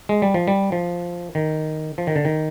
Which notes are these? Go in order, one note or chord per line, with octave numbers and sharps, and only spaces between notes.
G#3
G3
F3
G3
F3
D#3
F3
D#3
D3
D#3